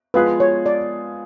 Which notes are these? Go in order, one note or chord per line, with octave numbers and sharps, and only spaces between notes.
F3 G#3 B3 F4 G#4 B4
C#5
D5